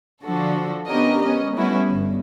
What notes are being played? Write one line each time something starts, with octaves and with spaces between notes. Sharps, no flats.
D3 F3 D4 F#4 A4
B3 C#4 D4 G4 A#4 D#5
G#3 B3 C#4 D#5
G3 A3 B3 C#4 E4 F#4
G1